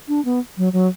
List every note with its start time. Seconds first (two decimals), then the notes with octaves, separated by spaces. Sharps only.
0.08 D4
0.25 B3
0.57 F#3
0.73 F#3